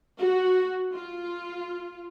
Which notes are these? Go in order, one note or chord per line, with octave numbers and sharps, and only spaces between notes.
F#4
F4